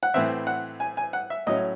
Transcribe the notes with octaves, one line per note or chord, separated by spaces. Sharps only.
F#5
A2 E3 C4 E5
F#5
G#5
G#5
F#5
E5
A2 F#3 C#4 D#5